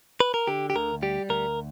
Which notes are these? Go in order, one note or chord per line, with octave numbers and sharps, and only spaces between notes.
B4
A#4
D3 G4
G4
D2 A#4
G3 G4
D2 A#4